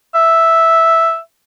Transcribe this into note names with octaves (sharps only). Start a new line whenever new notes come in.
E5